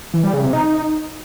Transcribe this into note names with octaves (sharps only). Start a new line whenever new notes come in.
E3
G3
C#3
C3
D#4